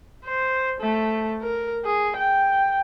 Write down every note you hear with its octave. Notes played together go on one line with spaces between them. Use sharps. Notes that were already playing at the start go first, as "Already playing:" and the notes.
C5
A3
A#4
G#4
G5